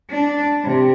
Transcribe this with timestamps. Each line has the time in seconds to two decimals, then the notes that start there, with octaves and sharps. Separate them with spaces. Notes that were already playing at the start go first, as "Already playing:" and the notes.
0.11 D4
0.64 C3